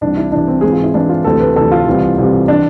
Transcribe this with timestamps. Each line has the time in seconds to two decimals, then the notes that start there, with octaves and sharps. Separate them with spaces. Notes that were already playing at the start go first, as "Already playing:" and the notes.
0.01 C2 C3 E3 D4
0.17 E4
0.32 C2 C3 E3 D4
0.48 C4
0.61 G#2 E3 G#4
0.73 F4
0.83 E4
0.94 G#2 E3 D4
1.09 F4
1.24 D2 C3 E3 A4
1.40 B4
1.56 D2 C3 E3 A4
1.71 F4
1.87 C2 C3 E3
2.18 C2 C3 E3
2.48 E3 D4